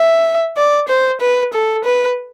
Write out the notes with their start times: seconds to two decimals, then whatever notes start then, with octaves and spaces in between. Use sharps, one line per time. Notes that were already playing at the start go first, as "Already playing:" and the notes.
Already playing: E5
0.57 D5
0.88 C5
1.21 B4
1.53 A4
1.84 B4